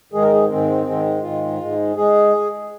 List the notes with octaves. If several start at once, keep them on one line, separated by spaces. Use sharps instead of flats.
G#2 D#3 G#3 G#4
A#4
G#4
G#2 D#3 G#3 C4
G#2 D#3 G#3
G#2 D#3 G#3 F4
G#2 G#3
G#3 G#4